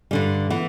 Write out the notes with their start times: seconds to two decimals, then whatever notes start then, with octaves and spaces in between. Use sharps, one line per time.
0.11 G2 D3 G3
0.50 E3 B3